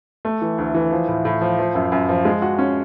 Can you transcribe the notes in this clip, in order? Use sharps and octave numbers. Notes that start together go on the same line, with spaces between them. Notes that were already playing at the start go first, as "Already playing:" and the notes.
A3
E3
D2
E3
F3
A2
A2
F3
F3
F#2
F#2
F3
G#3
F#4
C#4